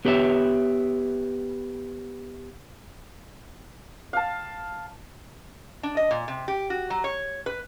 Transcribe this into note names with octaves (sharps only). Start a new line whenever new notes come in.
B3 G4 B4 C#5 E5
F5 A5
D4
D#5
A#2
C3
G4
F#4
F#3
C#5
B4